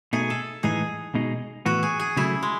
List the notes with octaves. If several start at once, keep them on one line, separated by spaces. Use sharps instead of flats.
B2 A3 D#4 G#4
A4
A2 E3 G#3 D#4 G#4
B2 G#3 D#4
A2 E3 B3 F#4
G#4
G#4
C#3 F#3 A3 E4
G#3